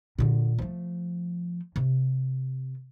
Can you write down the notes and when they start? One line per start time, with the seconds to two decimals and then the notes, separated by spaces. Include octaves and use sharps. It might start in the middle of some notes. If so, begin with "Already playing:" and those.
0.18 A#2 D3
0.59 F3 A3
1.76 C3